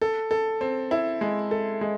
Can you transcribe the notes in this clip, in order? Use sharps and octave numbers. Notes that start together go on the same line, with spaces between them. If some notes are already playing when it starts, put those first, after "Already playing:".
A4
A4
C4
E4
G#3
A4
G#3